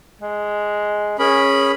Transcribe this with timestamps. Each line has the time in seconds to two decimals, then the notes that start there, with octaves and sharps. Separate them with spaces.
0.21 G#3
1.19 C#4 G#4 A#4 B5